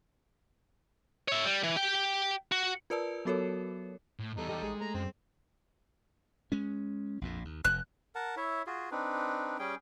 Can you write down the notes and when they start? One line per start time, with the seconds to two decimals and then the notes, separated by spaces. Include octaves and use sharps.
1.28 C#5 E5
1.45 G3
1.63 E3
1.76 G4 G5
2.52 F#4
2.90 F4 A#4 B4 D5 A5 E6
3.25 F#3 B3 F#4 A4 A#4 C#5
4.19 A2
4.37 E2 G3 D#4 A4
4.49 E2 G4 A4 D#5
4.62 A1 G#3 G#4
4.81 A3 A#5
4.94 F#2 C4
6.52 G#3 C#4
7.21 A#1 F2 A#2
7.45 D#2
7.65 F1 F2 F#6
8.15 A#4 F#5 A5
8.37 E4 C#5 E5
8.67 F4 F#4 G#4
8.91 C4 D4 D#4 B4
9.59 G3 C#4 G#4 G5